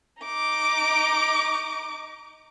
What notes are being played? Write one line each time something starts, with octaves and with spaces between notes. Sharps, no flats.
D#4 D6